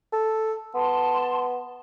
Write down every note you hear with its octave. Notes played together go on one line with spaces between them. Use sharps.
A4
B3 A5 C6